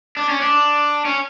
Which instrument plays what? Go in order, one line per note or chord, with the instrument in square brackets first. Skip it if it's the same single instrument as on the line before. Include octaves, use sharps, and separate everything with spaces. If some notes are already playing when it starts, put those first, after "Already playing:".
[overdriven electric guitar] D4
C#4
D4
C#4